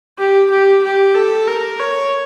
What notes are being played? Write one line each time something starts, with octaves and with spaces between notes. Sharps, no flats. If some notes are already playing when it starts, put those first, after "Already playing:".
G4
G4
G4
A4
A#4
C#5